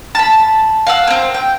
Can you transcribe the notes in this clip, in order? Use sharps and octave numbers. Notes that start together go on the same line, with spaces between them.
A5 B5
F5 F#5 E6
A#3 C4
G5